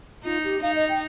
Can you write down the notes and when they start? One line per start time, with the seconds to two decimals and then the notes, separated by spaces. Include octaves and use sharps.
0.24 D#4 F4
0.44 G4
0.62 D#4 F5
0.76 D#5
0.88 G5